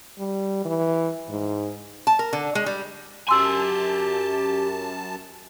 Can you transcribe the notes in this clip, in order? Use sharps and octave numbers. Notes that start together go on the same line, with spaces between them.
G3
E3
G#2
A5
A#4
D3
G#3
G3
F#2 G4 G#5 A5 C6 E6